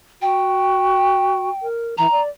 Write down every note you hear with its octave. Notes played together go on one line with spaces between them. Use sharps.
F#4 G5
A#4
E3 A#5
D5